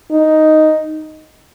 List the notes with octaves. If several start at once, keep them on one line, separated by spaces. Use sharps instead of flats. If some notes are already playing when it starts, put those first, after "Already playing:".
D#4